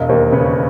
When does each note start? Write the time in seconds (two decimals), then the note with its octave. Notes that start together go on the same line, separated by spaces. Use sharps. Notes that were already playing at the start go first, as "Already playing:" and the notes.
Already playing: E1 D#5 F5
0.09 D#2 A#4 C5
0.32 C#3 B4 C#5